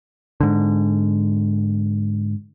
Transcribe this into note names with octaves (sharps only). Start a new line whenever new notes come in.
G#2 D3